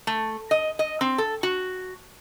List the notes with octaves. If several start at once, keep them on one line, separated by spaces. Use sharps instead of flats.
A3
D#5
D#5
C4
A4
F#4